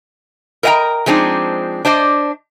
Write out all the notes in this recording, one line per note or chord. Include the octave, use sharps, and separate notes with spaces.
A#4 B4 D#5 F#5 G5 A#5
F3 G#3 C4 D4 D#4
D4 C5 D5 D#5